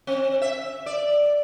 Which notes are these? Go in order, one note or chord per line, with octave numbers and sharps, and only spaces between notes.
C4
E5
D5